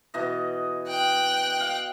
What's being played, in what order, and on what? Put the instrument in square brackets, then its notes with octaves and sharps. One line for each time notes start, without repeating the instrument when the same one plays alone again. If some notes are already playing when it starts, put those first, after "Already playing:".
[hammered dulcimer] B2 E3 D#5
[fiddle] G5 F#6
[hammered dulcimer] F5